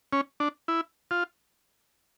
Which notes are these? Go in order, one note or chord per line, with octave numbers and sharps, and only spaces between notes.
C#4
D4
E4
F4